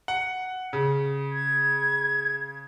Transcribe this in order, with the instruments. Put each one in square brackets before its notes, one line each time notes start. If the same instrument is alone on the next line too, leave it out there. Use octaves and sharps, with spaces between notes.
[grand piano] F#5
C#3
[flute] G#6